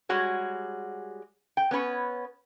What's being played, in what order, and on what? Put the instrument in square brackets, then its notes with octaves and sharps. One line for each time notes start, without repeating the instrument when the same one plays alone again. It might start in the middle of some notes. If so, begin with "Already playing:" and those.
[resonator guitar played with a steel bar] G3 G#3 F#4 G#4 C#5
G5
B3 C#4 B4 C#5